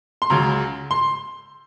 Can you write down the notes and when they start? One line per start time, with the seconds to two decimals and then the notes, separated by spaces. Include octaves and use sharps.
0.22 C6
0.30 C#2 C#3 F#3 A#5
0.91 C6